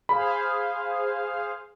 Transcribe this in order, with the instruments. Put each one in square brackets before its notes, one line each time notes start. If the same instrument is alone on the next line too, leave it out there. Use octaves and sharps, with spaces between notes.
[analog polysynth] G#4 C5 F5 [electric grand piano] B5